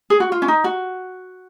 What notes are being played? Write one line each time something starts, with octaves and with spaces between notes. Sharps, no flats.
G#4
F#4
F4
C#4
D#4
F#4